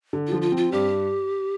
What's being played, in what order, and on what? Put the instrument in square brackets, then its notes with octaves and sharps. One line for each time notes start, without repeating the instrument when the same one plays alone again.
[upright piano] D3
[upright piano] F3 [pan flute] F4
[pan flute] F4
[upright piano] C4
[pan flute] F4
[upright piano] G2 [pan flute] G4